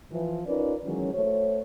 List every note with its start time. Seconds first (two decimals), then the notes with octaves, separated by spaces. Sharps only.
0.12 E3 F3
0.46 C#4 D#4 F4 A#4 B4 D5
0.85 D#3 E3 F#3 G#3 C#4
1.14 A3 F#4 C5 C#5